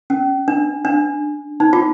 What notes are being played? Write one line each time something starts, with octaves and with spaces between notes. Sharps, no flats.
C#4
D4
D4
D#4
F4